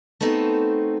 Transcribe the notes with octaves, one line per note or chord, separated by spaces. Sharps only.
A3 B3 C4 D#4 F#4 A4